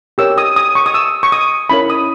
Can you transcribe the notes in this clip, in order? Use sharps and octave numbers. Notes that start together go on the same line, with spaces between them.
G4 A#4 C#5 E6
D#6
D#6
C#6
D#6
E6
C#6
D#6
C#4 E4 A#4 C#5 B5
D#6